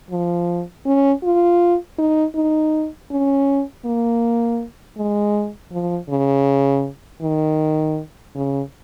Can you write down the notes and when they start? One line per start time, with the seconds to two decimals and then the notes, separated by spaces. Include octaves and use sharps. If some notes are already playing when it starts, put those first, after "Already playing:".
0.11 F3
0.86 C#4
1.23 F4
1.99 D#4
2.35 D#4
3.11 C#4
3.85 A#3
4.97 G#3
5.72 F3
6.09 C#3
7.22 D#3
8.35 C#3